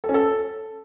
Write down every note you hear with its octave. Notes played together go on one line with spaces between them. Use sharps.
A4
C#4
A4